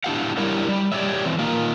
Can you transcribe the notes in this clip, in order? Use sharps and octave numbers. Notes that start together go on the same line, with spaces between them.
D4 E4 F#4 G4 F5 F#5
G3 E4 G4 A#4 C#5
G3
G4 C#5 D5 E5
E3 C4
A#3 D#4 F4 A#4